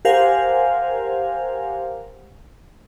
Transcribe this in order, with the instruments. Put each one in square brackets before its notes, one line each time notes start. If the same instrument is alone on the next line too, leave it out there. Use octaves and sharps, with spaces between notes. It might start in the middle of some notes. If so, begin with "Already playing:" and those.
[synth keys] G4 A#4 C5 F5 F#5 G#5